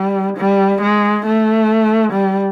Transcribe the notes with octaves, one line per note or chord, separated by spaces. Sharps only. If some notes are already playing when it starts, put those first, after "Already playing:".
Already playing: G3
G3
G#3
A3
G3